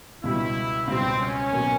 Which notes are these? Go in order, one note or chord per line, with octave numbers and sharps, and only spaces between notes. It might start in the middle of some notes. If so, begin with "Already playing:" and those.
C#2 B2 G3 E4
C#2 B2 G3 C4
C#4
B2 F#3 A#3